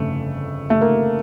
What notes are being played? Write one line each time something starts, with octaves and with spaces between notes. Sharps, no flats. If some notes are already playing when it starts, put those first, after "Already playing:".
Already playing: G1 F2 C#3 A3
A3
A#3